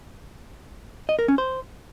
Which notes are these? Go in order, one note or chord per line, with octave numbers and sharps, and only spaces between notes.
D#5
A#4
C#4
C5